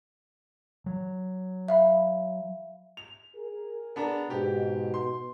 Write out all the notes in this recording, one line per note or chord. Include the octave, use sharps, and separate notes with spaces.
F#3
E5 F5 B5
F7
G#4 A#4
B3 D4 A#5
G#2 B2 G4
C6